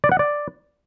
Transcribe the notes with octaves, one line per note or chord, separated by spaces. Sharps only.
D5
F#5
D5